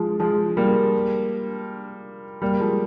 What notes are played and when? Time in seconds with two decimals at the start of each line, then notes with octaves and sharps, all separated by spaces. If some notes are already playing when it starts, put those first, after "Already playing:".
Already playing: F3 G#3
0.20 F3 G#3
0.57 G3 A#3
2.42 G3 A#3
2.60 F3 G#3